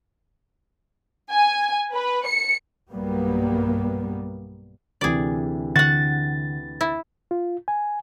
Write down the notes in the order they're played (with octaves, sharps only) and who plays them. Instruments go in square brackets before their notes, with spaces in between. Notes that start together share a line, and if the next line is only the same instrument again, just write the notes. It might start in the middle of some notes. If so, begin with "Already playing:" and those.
[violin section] G#5
B4
C#7
[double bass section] B1 G2 F#3 G3 A#3 B3
[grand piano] D2 C3 E3 [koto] G#4 D5
[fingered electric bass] D3 [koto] F#4 F#5 [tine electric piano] A6
[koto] E4
[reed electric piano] F4
G#5